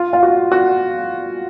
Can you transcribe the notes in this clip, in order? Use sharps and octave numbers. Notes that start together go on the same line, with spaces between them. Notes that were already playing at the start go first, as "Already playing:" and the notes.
Already playing: F4
F4
F#4
F#4